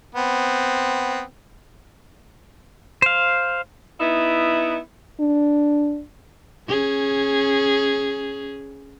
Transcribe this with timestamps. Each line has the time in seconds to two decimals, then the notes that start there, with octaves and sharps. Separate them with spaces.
0.15 B3 C4
3.02 C5 F5
4.00 B3 D#4 E4
5.20 D4
6.68 C#4 G#4